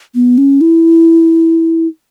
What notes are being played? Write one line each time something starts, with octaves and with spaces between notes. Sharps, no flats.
B3
C#4
E4